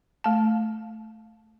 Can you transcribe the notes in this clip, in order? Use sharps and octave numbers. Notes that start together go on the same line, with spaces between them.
A3 A5